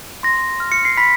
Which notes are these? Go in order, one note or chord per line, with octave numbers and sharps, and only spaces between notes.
C6 A#6
F6
C#7
C7
B5 B6